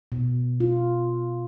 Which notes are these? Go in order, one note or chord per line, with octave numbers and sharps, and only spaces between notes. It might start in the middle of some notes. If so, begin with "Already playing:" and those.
B2
F4